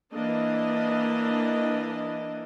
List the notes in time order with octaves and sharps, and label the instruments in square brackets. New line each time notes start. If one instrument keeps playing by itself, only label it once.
[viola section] E3 A#3 D4 D#5